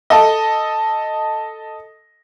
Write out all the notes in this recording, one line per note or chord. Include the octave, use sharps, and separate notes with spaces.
A4 D#5